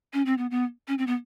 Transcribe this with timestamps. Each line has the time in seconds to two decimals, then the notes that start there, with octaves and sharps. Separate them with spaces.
0.13 C#4
0.26 C4
0.38 B3
0.51 B3
0.88 C#4
0.98 C4
1.07 B3